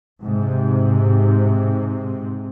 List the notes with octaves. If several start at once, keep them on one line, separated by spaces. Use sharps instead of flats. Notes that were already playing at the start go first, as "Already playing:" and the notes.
G#2 C3